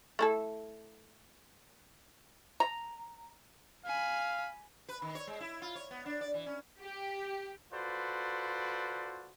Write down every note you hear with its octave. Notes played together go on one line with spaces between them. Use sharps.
A3 E4 A4
A#5
F5 G#5 B5
B4
D#3
C#5
G#3
E4
F4
C#5
B3
D4
D5
E3
C#4
G4
F4 F#4 A4 B4 C5 D5